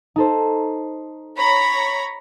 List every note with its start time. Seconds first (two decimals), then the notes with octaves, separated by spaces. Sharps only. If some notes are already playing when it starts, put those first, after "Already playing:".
0.16 D#4 A4 C5
1.38 C#5 A#5 B5